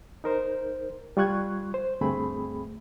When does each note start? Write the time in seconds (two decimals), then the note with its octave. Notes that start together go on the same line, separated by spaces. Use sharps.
0.24 D#4 A#4 C5
1.17 G3 F4 C#6 F#6 G#6
1.74 C5
2.01 D2 G2 A3 C4 G#4 B5